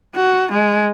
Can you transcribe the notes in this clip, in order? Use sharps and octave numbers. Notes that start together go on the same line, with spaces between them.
F#4
G#3